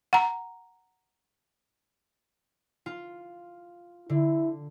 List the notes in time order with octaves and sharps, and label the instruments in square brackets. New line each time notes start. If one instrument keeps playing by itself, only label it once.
[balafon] F#5 A#5
[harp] F4
[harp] D3 [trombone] E4